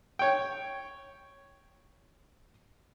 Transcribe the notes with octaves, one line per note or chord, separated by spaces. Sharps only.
C#5 G5